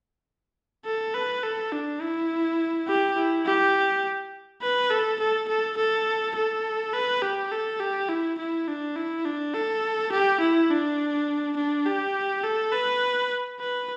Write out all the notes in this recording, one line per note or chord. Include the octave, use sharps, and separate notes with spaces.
A4
B4
A4
D4
E4
G4
E4
G4
B4
A4
A4
A4
A4
A4
B4
G4
A4
G4
E4
E4
D4
E4
D4
A4
G4
E4
D4
D4
G4
A4
B4
B4